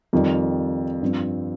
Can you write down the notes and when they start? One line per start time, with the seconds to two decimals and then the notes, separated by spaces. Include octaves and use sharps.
0.13 F2 D#3 G3
1.02 G2 F3 C4